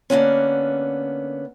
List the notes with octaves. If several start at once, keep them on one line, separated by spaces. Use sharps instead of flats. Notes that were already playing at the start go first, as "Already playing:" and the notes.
D3 A#3 B3 C#4